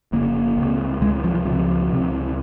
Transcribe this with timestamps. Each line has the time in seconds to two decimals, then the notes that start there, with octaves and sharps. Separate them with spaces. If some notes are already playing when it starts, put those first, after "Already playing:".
0.12 F1 F2 C#3 A#3
0.57 C#2 C3
1.01 C#2 C3 G#3
1.24 F3
1.35 F3
1.46 C#2 C3 F3
1.90 C#2 C3